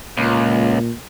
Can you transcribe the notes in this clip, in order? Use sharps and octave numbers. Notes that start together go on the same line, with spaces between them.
C#2 A#2